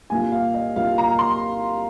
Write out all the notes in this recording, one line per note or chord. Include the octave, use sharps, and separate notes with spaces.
C2 A#2 A#3 F4 G#5
F5
D#5
C2 A#2 A#3 F4 F5
A#5
C6